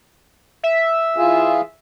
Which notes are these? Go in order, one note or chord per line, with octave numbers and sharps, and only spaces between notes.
E5
E3 F4 G#4